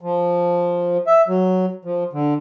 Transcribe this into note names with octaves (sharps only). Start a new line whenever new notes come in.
F3
E5
F#3
F3
D3